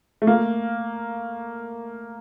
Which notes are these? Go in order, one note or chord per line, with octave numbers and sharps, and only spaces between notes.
A3
A#3